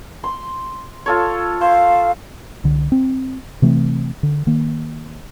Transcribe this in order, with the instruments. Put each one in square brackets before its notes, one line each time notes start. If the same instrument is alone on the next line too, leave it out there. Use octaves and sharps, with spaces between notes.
[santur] C6
F4 A4 C#5
[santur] C5 [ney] F5
[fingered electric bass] C2 D3
C4
C3 E3 A3 C4
D3
D#3 A#3